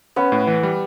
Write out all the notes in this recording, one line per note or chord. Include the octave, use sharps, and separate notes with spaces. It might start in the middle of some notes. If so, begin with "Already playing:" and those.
B3 C#4
A2
E3
G3